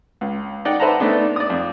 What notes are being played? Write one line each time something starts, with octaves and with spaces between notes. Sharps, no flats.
C#2
D#4 D5 F#5 G5
B4 C5 E5 F#5 A5 A#5
A3 B3 D4 D#4
D5 D#6
F2